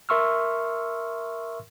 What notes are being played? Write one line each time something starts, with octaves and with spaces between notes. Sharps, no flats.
A#4 E5 C6 C#6 E6 F6